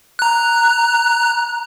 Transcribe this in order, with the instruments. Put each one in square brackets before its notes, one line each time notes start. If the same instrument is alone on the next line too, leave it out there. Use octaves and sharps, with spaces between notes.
[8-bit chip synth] A#5 F#6